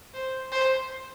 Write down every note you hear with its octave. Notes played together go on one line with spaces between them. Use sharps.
C5
C5